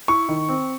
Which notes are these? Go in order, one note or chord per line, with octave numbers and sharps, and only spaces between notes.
E4 C#6
D#3
C4